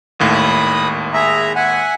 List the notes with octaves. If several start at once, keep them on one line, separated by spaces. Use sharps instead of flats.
G#1 D#2 A2
B5 D#6
G#4 E5 A#5
E5 F#5 G#5